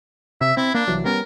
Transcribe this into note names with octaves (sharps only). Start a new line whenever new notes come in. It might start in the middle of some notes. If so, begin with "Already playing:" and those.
C3 E5
C4 E4
A#3 D4
C2 E3 F#3
G3 B3 C#4 A#4